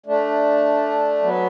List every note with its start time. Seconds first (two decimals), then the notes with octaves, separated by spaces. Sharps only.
0.06 A3 D4
1.23 F#3 B3